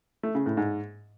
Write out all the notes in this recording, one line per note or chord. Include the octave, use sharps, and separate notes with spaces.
A3
C#3
A2
G#2